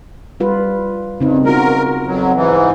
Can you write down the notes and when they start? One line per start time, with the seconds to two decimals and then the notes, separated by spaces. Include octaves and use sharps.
0.40 G3 F4 B4
1.20 G2 C#3 C4 D#4
1.45 B3 F4 F#4 A#4
2.07 F2 F#3
2.34 G#2 E3